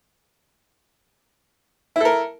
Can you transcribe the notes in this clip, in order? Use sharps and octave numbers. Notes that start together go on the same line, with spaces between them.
E4 A4 A#4